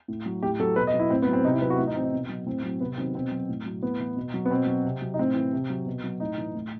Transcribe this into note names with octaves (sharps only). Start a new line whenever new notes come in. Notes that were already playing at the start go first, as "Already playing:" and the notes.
A2
F#3
A2 G4
F#3 A4
B2 B4
D#5
F#3
E4
A2 C4
B3
F#3
C4
C3 D#4
E4
F#3 B4
F#4
A2 E4
D#4
E3 C4
D#4
B2
F#3
A2 C4
F#3
C3 B3
D#3 F#3 C4
B2 C4
F#3
A2
F#3
A2 B3
E3
B2
F#3
B3
B2 C4
F#3
C3
F#3
D#4
A2 C4
E3
C3
F#3
B2
F#3
A2 D#4
E3
A2